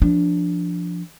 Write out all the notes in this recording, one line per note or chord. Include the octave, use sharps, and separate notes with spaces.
F3 D4